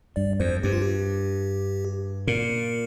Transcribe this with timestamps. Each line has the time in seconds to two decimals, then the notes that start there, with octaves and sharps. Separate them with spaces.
0.16 G2 D5
0.40 F2 C5
0.63 G2 G4
0.73 F4
0.82 G4
2.27 A#2 A#4